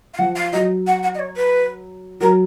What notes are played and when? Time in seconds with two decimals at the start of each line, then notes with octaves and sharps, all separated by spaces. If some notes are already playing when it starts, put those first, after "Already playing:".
0.14 F5
0.19 F3 F#5
0.36 F5
0.52 F#3 D#5
0.87 F#5
1.03 F#5
1.15 D#5
1.19 C#5
1.37 B4
2.21 F#3 A#4